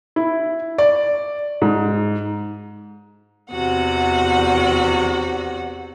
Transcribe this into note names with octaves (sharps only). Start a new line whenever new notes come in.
E4
D5
G#2
E2 C3 F#4 F#5